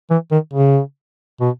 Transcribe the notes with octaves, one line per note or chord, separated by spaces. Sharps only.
E3
D#3
C#3
B2